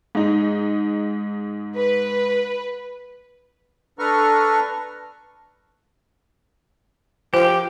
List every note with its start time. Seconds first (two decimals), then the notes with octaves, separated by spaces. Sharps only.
0.15 G#2 D#4
1.75 B4
3.99 D4 A4 B4 A#5 C#6 F6
7.34 F3 G4 C5 G#5